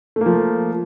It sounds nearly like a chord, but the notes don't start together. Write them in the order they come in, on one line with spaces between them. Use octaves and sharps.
A3 A#3 F3